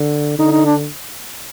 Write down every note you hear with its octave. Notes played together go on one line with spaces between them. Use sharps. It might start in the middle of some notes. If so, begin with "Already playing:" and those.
Already playing: D3
D3 D#4
D#4
D4